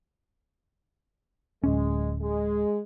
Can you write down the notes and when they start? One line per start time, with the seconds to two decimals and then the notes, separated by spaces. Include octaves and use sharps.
1.64 D1 G#3 C#4
2.21 G#3